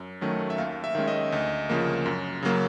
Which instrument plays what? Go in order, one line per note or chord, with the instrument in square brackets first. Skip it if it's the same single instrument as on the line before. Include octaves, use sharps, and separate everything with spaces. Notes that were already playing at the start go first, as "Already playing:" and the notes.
Already playing: [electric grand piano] F#2
D#3 F#3 A3 C#4
E5
D#2 F5
E5
D#3 G#3 C#4
D#5
D2
C#3 F3 A#3
F#2
C#3 F#3 A#3